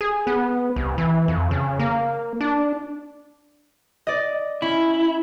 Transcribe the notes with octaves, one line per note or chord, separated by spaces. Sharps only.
G#4
B3
C2
E3
F2
C#3
A#3
D4
D5 D#5
C#4 E4